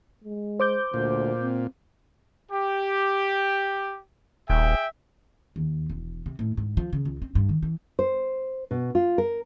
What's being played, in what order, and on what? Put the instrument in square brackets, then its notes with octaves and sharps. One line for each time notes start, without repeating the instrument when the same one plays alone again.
[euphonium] G#3
[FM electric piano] C5 D6 G6
[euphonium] D2 [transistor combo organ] A#2
[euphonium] C4
[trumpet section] G4
[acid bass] D#1 [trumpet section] G#4 E5 G5
[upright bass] D#2
E1
C3
A2
G#2
F3
C#3
C#2
C4
G2
D#3
E3
[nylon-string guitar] C5
B2
F4
A#4